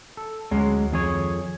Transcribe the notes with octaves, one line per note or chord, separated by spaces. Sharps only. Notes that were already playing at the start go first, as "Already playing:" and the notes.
A4
D2 F#3 G#3 C#4
F2 D#3 G#4 C#5